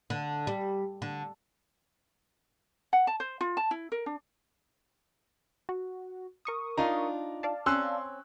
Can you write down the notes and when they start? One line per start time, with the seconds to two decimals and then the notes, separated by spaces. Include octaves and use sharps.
0.10 D3
0.47 G3
1.02 D3
2.93 F#5
3.07 A5
3.20 C5
3.41 F4
3.57 A5
3.71 E4
3.92 A#4
4.06 D4
5.69 F#4
6.45 A#4 C#6 D#6
6.78 D4 D#4 F4 A#5
7.43 D5 F5 A5
7.66 C4 C#4 C6 E6 F#6